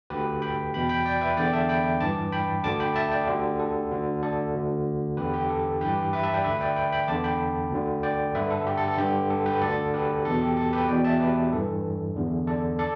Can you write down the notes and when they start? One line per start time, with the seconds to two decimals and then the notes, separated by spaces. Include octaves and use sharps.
0.10 D2 D3 G4 B4
0.42 G5 B5
0.73 E2 B2 G5 B5
0.89 G5 B5
1.05 D5 G5
1.21 B4 E5
1.37 E2 D3 D5 G5
1.53 E5 A5
1.69 G5 B5
2.00 G2 E3 A5 D6
2.32 G5 B5
2.64 D2 D3 A5 D6
2.80 G5 B5
2.96 E5 A5
3.12 D5 G5
3.27 D2 D3 G4
3.59 A4
3.91 D2 D3
4.23 A4 D5
4.54 D2 D3
5.17 E2 D3 G4 B4
5.34 G4
5.49 A4
5.81 G2 E3 G4 B4
6.13 B4 E5
6.23 E5 A5
6.34 D5 G5
6.44 D2 D3 B4 E5
6.61 D5 G5
6.76 G5 B5
6.92 G5 B5
7.08 E2 D3 A5 D6
7.24 G5 B5
7.72 D2 D3
8.03 D5 G5
8.35 G2 D3 B4 E5
8.51 A4
8.67 G4
8.77 A4
8.88 A4
8.98 G2 D3 G4
9.30 A4
9.46 G4 B4
9.62 D2 D3 A4 D5
9.94 G4 B4
10.25 E2 B2 A4
10.41 G4
10.57 A4
10.73 G4 B4
10.89 E2 B2 D5 G5
11.04 E5 A5
11.20 G4 B4
11.52 G2 E3 A4
12.16 E2 D3
12.47 A4 D5
12.79 A4 D5